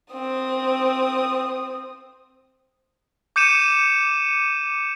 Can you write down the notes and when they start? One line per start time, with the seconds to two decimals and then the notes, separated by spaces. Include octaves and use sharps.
0.13 C4 D#6
3.36 D6 G6 C#7 D#7 E7